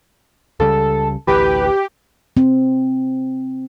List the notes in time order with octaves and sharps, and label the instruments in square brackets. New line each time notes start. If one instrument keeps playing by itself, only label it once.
[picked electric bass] C#2 C#3 G3 [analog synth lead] A4
[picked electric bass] A1 D2 E3 [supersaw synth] G4 [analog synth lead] B4
[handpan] C4